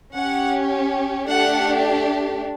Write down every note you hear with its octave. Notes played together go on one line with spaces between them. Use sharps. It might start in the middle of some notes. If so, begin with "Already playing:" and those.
C#4 G4 F#5
A3 D4 G4 F#5